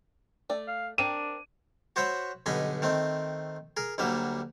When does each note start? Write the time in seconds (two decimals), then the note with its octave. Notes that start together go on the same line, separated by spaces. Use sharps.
0.50 A3 D5
0.68 F5
0.98 C4 D4 A#4 D#7
1.96 F#4 C5 C#5 E5 F#5 B5
2.46 B1 G2 D3 D#5 G#5 B5
2.82 D#3 A3 C4
3.77 G#4 A#4
3.98 D2 D3 F#3 G3 A#3 E5